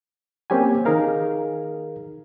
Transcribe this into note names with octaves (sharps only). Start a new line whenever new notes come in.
A#3 C4 C#4 G4 G5 G#5
D#3 D#4 G#4 A#4 F5